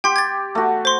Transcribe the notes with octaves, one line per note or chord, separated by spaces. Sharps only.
G4 G5 C6
G#6 A6
A3 F#4
C5 C6